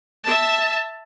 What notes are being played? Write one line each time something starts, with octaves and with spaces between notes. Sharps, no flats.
E5 A5